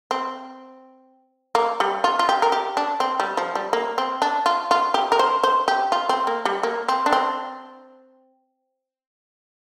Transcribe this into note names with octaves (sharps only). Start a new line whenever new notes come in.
C4
A#3
G3
F4
F4
G4
A#4
G4
D4
C4
G3
F3
G3
A#3
C4
D4
F4
F4
G4
A#4
C5
C5
G4
F4
C4
A#3
G3
A#3
C4
D4
C4